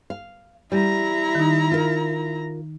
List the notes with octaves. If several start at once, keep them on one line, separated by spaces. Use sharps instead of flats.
F5
G3 E4 A#5
D#3 D#4
F4 A#4